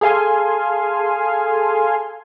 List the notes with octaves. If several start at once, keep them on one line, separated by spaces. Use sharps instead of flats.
G#4 A4 F5 G#5 C6